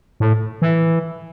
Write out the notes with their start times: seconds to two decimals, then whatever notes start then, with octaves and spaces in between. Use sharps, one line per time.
0.20 A2
0.62 E3